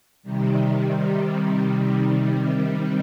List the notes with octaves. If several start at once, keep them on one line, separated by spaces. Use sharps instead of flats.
C3 D#3 G3